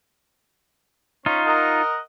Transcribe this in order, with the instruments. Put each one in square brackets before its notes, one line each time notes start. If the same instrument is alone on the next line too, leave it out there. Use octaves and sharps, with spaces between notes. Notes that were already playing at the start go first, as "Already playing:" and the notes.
[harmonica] C#4 [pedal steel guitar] D#4 F4
[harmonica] A#4 D#5 F#5